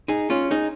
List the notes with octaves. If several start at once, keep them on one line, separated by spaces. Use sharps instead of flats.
D#4 G#4
C#4 F4
D#4 G#4